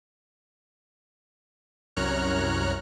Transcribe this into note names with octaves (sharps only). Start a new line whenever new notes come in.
C2 F#2 C#5 A#5 F6 F#6